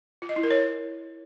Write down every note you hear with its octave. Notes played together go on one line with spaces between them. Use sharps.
F4
D#5
E4
A#4
C#5